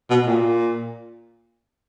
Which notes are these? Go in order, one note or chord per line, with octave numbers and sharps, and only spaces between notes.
B2
A#2